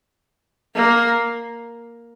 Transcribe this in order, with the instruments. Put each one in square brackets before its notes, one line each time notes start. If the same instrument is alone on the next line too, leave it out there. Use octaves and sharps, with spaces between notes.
[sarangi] A#3